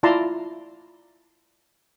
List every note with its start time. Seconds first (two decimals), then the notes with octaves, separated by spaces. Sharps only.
0.03 E4 F4 D5 A5 A#5 C6